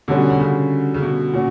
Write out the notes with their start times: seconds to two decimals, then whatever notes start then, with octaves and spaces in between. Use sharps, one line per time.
0.08 B2 D3 G3 C#4 F#4
0.30 B2
0.40 C#3
0.94 C#3
1.02 B2
1.33 A#2 C#4 F#4